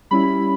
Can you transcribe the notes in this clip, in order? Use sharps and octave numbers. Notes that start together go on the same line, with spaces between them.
G3 C#4 E4 B5